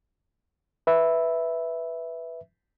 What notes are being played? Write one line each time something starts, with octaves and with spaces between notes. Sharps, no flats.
B4 E5